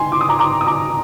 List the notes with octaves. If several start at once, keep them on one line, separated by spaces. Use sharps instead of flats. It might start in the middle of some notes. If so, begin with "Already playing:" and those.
Already playing: G#2 G#5 C6
D6
D#6
A#5 D6
A#5 D6
D#6
A#5 D6